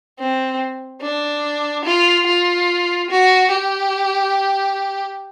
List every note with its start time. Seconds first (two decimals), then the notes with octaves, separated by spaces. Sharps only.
0.19 C4
1.02 D4
1.85 F4
2.26 F4
3.10 F#4
3.51 G4